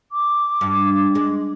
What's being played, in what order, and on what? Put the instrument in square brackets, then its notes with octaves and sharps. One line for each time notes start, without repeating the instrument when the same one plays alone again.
[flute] D6
[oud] G2
G#3